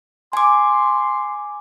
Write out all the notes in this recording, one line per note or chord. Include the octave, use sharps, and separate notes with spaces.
G#5 C6 D6